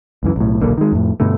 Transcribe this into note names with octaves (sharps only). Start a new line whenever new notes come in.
C#2 F#2 E3
B1 A2
D#1 B1 D3 A#3
D#3 G#3
F2 A2
G2 B2 D3 A3